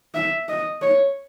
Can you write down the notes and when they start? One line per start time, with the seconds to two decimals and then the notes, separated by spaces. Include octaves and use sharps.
0.15 E5
0.49 D#5
0.82 C#5